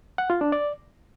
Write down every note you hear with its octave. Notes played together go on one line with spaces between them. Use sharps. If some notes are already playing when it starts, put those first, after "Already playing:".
F#5
F4
D4
D5